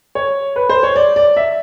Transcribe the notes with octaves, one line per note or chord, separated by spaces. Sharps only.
C#5
B4
C5
C#5
D5
D5
E5